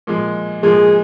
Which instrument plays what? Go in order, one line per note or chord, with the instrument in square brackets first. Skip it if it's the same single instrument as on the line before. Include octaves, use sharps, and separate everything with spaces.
[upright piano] A#2 F3 G#3
[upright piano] A#2 F3 G#3 [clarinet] G#4